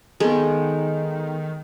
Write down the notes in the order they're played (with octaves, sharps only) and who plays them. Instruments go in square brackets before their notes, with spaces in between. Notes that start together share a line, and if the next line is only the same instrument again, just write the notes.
[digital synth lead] D#3 [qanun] G#3 [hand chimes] B3 A4